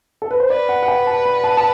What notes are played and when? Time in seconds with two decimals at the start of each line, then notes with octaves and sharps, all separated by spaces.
0.22 A4
0.31 B4
0.40 C5
0.50 B4 D5
0.69 F#5
0.83 F#5
0.88 G5
1.07 A5
1.26 B5
1.44 A5
1.57 A5